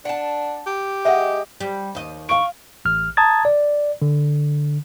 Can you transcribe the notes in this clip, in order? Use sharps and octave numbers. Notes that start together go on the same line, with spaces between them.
D4 F#5 A5
G4
G#3 D#5 E5 F#5
G3
D#2 D#5
F5 C#6 D7
A1 F6
A5 A#5 D#6 G#6 A6
D5
D3